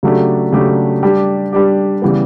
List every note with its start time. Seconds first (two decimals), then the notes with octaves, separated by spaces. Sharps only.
0.03 C#3 F#3 A3 D4 G4
0.53 C#3 F#3 A3 D4 G4
1.03 G3 D4 G4
1.52 G3 D4 G4
2.02 C#3 E3 G3 B3